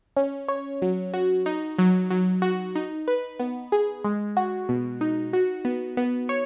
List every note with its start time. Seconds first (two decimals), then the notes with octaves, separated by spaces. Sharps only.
0.17 C#4
0.48 C#5
0.82 F#3
1.14 F#4
1.46 D#4
1.79 F#3
2.11 F#3
2.42 F#4
2.75 D#4
3.08 B4
3.40 B3
3.72 G#4
4.04 G#3
4.37 F#4
4.69 B2
5.01 D#4
5.33 F#4
5.65 B3
5.97 B3
6.29 C#5